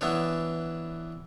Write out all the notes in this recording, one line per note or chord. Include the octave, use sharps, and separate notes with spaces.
E3 B3 D4 C#5